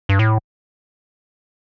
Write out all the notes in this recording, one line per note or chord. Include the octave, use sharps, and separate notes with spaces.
G2
A2